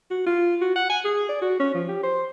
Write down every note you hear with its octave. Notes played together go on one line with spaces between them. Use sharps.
F#4
F4
F#4
F#5
G#5
G#4
D5
F#4
C#4
F3
G4
C5